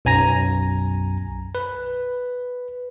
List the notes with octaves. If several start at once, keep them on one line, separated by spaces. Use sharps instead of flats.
B1 F#2 G#5 A#5 A#6
B4